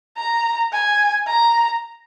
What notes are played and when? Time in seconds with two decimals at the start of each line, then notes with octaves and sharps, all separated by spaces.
0.17 A#5
0.72 G#5
1.27 A#5